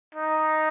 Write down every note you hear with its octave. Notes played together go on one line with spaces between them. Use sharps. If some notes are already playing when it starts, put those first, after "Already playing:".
D#4